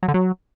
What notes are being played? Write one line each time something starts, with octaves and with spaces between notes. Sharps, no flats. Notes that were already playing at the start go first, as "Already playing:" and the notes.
F#3
D3
F#3